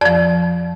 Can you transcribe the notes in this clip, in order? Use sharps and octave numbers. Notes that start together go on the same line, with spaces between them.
F2 F3 D5